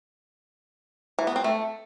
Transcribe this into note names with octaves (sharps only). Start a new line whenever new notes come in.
E3
B3
C4
A3